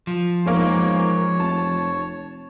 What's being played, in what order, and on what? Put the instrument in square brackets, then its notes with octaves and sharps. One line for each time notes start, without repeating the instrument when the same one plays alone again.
[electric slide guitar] F3
[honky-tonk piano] E2 A#3 [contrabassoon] G#2 [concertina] C#5
[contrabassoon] F1 [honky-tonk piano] A5